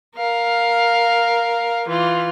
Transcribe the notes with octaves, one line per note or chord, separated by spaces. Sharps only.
A#4 F5
E3 F4